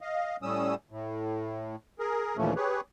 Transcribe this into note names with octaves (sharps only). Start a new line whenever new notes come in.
D#5 F5
A2 G3 C#4 D#6 E6
A2
G#4 A#4
D#2 A#2 E3 F3 A3 C#4
G4 G#4 B4 C#5